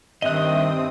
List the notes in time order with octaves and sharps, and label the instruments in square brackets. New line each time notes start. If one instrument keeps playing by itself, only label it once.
[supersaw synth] G2 C4 D#6 [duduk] D#3 [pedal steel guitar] D#5 F#6 [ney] E5